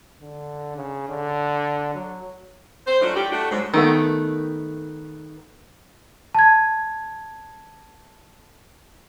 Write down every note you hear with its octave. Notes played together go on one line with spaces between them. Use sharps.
D3
C#3
D3
F#3
C5
F3 F#3 A3 C#4 D4 F4
A2 G3 F#4 G4
A3 D4 F#4
G#2 F#3 G#3
D#3 A3 B3
A5 G#6